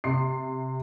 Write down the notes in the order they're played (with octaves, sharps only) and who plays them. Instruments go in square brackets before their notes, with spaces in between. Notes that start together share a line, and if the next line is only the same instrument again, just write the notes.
[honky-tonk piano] C3 C6 C7